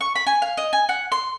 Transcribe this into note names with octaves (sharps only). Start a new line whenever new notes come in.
C#6
B5
G#5
F5
D#5
G#5
F#5
C6